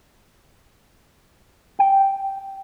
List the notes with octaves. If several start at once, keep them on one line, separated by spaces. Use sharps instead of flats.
G5